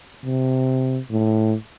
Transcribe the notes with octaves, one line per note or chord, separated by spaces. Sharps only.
C3
A2